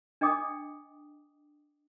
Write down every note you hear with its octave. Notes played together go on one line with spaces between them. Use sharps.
D4 D#5 G5 D6 D#6